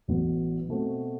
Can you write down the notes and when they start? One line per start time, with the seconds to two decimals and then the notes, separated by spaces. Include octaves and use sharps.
0.08 A1 A2 F#3 B3
0.69 B2 A3 C4 F#4